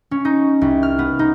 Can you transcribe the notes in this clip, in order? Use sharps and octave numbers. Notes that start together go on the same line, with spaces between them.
C#4
D#4
C2
F6
B3
D#4